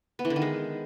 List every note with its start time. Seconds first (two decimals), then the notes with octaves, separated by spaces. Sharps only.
0.19 B3
0.25 E3
0.30 D3
0.36 D#3
0.42 G#3